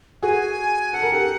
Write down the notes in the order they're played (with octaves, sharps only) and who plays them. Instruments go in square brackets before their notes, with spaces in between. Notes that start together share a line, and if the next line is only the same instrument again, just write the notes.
[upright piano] F#4 G#4 [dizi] G#5
[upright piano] A4 [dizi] F#5
[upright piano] A#4
G4 A4